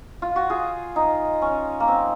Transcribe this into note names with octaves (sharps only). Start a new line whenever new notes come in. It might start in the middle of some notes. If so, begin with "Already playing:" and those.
F4
F#4
F4 G#4
D#4
C#4
A#3
C4